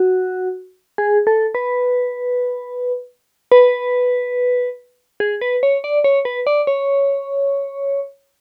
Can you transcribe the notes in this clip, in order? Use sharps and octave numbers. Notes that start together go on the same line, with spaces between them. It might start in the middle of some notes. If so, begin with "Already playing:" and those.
Already playing: F#4
G#4
A4
B4
B4
G#4
B4
C#5
D5
C#5
B4
D5
C#5